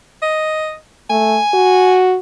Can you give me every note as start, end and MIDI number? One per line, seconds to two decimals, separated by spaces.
0.23 0.76 75
1.10 1.38 57
1.10 2.01 80
1.54 2.18 66